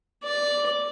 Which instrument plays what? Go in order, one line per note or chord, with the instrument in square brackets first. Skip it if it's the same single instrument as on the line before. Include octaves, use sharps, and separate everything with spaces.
[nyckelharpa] D5